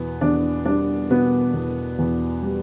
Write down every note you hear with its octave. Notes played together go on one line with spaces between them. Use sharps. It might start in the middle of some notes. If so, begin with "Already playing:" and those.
Already playing: E2 B2 B3
E2 D4
G3 D4
B2 B3
E2
E2
G3